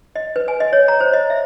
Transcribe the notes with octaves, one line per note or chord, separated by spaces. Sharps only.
D#5
B4
G#5
D#5
C#5
A#5
C5
D#5
E5